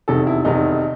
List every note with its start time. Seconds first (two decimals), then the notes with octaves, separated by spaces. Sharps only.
0.08 F1 E2 C3 D#3 A4
0.27 E4
0.45 F1 E2 C3 D#3 D#4